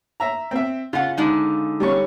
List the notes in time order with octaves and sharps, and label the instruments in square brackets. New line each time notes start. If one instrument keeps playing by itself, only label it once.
[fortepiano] E5 A#5
C4 E5
[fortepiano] C#3 [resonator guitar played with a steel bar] F4 F#5
[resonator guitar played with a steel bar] D3 G#3 D#4
[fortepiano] G3 C#4 C#6